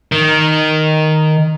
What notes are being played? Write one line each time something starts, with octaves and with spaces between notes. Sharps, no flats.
D#3